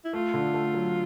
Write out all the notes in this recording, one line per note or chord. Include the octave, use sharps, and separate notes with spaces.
E4
A3 F4
D3
A3
F#3